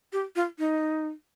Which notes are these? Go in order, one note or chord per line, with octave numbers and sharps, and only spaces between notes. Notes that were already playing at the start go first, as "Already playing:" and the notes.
G4
F4
D#4